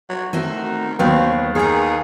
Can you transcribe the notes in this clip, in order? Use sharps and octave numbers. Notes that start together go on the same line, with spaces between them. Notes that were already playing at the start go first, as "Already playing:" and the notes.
F#3
D#3 A3 C4 F#4
D#2 F#3 B3 C4
D#3 G#4 F5 A#5